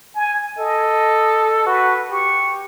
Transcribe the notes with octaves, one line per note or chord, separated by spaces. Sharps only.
G#5
A4 D#5
F#4 B4
G4 C#6